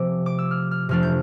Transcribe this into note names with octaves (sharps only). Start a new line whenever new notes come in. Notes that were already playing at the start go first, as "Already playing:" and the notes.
Already playing: C3 F3 A3 C4 D6 E6
D6
E6
F6
F6
F2 C3 F3 A3 D4 F6
G6